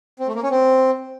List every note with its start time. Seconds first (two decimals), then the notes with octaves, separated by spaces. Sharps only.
0.19 C4
0.27 A3
0.35 A#3
0.43 C#4
0.51 C4